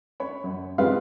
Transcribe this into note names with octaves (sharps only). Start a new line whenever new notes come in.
C#5 B5
F#2
G3 G#3 C4 F4 B4 F5